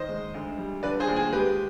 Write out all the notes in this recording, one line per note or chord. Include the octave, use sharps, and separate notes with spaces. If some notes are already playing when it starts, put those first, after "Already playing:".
Already playing: D#3 C5 D#5
G#3
D2
G3
D3 B4 D5
G#4 C5
D#2
G#4
G#3 G4 B4